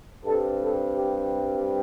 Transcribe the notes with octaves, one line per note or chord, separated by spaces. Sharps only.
G2 G3 C4 A4
A4
G4